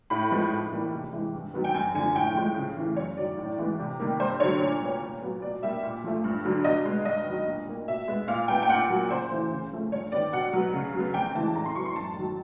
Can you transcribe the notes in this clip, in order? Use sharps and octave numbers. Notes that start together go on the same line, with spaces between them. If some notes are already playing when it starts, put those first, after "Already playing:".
A2 B5
F3 G#3 B3
G#2
E3 G3 A#3
C3
E3 G#3
G2
D#3 F#3 B3
G5
F#2 G#5
D3 F3 G#5
A2 G5
F3 G#3
C#3
E3 A3
F#2 C#5
D#3 F#3 D5
A2
E3 G#3 B3
C3
D#3 G3 A#3
G2 C5
D3 F#3 C#5
A#2
G3 B3
A#2
F#3 B3
B2 D5
G3 A#3 E5
A#2
F3 A3
G2
D3 F#3
B2 D#5
G#3 B3
G2 D#5
D#3 F#3
A#2
G3 A#3
B2 E5
G#3 B3
A#2 F5
G3 B3 G5
G5
A#2 F#5
F#3 A#3
C#3 C5
E3 A3
C#3
F3 A3
G2 C#5
D#3 G3 B3 D5
B2 F#5
F#3 B3
C#3
F#3 B3
F2 G5
C#3 E3 G#3 A5
A2 A#5
C6
F#3 B3 C#6
C6
F#2 A5
D#3 F#3